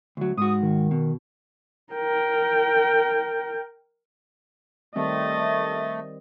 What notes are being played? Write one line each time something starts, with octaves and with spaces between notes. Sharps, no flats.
D2 F#3
G#2 F#4 D#6
D#3
B2
A#4 G5
D#3 G3 A3 C4 D#5 A6